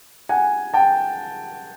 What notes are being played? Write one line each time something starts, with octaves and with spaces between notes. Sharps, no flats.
F#5 G#5
G5 A5